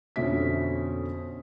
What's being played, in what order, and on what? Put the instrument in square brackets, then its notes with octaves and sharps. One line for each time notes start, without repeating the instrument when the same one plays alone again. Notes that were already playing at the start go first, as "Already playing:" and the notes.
[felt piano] F2 B2 D3 C#4 E5 B6